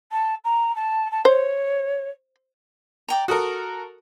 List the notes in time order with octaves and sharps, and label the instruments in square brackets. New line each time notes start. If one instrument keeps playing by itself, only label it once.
[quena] A5
A#5
A5
A5
[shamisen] C5 [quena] C#5
[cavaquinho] D5 G5 A#5
[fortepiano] F#4 A4 A#4 [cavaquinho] D#6